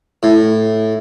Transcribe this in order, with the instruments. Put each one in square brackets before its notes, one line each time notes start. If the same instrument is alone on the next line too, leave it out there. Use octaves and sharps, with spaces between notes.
[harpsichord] A2